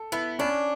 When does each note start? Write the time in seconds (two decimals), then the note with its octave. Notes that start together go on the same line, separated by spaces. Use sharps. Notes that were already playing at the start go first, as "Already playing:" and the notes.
Already playing: A4
0.12 B3 E4
0.39 C#4 D4